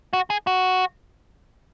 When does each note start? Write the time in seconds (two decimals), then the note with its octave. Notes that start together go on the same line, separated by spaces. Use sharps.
0.13 F#4
0.30 G#4
0.47 F#4